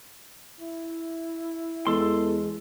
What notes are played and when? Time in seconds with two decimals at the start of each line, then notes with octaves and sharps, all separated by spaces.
0.61 E4
1.87 E2 G#3 A4 C6